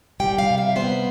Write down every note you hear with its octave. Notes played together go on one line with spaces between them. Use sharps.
G3 G5
F5
C3
E5
B3 C5